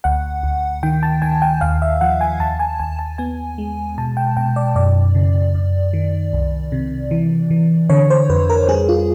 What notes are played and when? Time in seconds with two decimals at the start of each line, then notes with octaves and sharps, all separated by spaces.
0.04 D2 F#5
0.43 D2
0.83 D#3 G5
1.03 A5
1.22 D#3 G#5
1.42 G5
1.61 D#2 F5
1.82 E5
2.01 F3 F#5
2.21 G#5
2.40 D#2 A5
2.59 G#5
2.80 D#2 G#5
2.99 A5
3.18 B3 G#5
3.58 G#3
3.98 B2 A5
4.17 G5
4.37 B2 G5
4.56 D5
4.75 F#2 D5
5.15 C#3
5.55 F#2
5.93 D#3
6.33 C2
6.72 C3
7.11 E3
7.51 E3
7.89 D3 C#5
8.10 C5
8.29 F2 B4
8.50 A#4
8.68 G3 G#4
8.89 F4